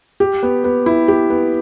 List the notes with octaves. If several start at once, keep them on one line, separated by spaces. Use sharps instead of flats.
G4
B3
B3
E4
G4
B3